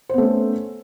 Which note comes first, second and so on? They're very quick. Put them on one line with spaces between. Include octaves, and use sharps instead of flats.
C5 B3 A3 C#4